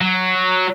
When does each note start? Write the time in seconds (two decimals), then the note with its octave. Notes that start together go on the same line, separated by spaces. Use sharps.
0.01 F#3